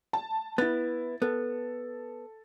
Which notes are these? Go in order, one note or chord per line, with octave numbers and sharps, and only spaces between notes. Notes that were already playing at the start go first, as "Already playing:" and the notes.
A5
B3 E4 A6
B3 A4